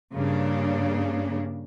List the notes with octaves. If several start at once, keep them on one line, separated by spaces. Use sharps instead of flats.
G2 C#3 A#3 D4